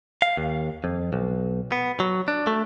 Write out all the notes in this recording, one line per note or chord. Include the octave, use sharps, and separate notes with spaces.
F5
D#2
F2
B1
B3
F#3
D4
A3